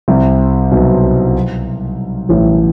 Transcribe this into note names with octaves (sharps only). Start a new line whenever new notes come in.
C2 C3
B1 B2
A1 A2